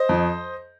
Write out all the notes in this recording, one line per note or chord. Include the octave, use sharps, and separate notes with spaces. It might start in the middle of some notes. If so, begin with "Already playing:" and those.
Already playing: C5 D#5
F2